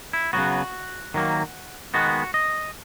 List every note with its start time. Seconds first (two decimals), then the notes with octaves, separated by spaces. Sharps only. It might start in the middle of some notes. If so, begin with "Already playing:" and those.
0.13 E4
0.33 C#3 F#3 B3 F#4
1.14 D#3 F#3 A#3
1.94 D#3 G#3 B3 F#4
2.34 D#5